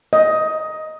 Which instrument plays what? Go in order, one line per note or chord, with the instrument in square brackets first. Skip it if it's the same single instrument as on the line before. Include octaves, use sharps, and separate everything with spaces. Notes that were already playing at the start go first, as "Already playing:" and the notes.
[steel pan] D#5